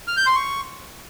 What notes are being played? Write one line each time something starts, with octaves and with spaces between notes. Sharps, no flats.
F6
G6
C6
C#6